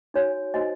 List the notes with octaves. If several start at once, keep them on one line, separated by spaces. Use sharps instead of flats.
D#4 F#4 C#5 G#5
D#4 F#4 C5 D#5 G#5